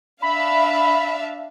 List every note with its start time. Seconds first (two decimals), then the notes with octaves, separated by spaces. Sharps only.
0.22 D4 E5 F5 B5